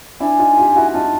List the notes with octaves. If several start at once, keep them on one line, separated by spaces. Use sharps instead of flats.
D4 E4 G#5
D#4 F4
F4 G4
E4 F#4
D#4 F4 A5